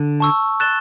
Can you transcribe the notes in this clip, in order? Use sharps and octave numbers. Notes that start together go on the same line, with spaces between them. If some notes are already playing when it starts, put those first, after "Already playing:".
Already playing: D3
A5 C#6 E6
F#6 A6 E7 G7